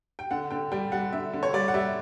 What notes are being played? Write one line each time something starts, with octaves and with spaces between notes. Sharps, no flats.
G5
D3 F#5
D3 G5
G3 G5
G3 F#5
D3 E5
D3
C#5
G3 D5
F#5
G3 E5